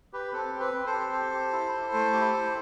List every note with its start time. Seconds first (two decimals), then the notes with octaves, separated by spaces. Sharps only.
0.13 G4 B4
0.33 C4 A4
0.53 C4
0.60 B4
0.73 C4
0.86 A4 C5
0.93 G4
1.13 G4
1.33 G4
1.53 E4
1.73 E4
1.93 A3
2.13 G4
2.33 E4